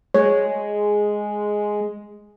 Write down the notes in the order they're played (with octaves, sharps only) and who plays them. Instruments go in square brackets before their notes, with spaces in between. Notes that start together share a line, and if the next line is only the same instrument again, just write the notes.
[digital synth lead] G#3 [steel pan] C#5